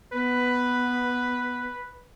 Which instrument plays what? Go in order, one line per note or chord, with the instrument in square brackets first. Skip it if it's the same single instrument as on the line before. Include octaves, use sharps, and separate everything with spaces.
[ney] B3 [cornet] B4